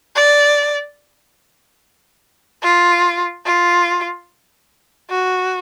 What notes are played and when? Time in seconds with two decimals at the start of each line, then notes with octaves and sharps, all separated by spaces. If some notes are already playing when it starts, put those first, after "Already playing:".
0.15 D5
2.63 F4
3.45 F4
5.10 F#4